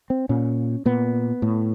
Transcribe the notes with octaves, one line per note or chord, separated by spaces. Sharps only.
C4
A#2 C#4
A#2 B3
A2